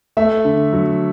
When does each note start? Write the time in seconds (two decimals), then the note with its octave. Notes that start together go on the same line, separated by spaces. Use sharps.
0.17 A3 E5
0.45 D3
0.73 F#3